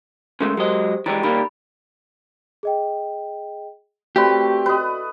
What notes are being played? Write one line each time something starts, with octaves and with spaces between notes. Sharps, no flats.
C#3 G#3 A3 A#4 C6
F#3 G#3 G4 C5 D#5
E3 G3 G#3 A#5 A6 D7
D#3 G3 A#3 B5
G#4 D#5 G5
A3 C4 F#4 G4 B4 D5
B4 D#5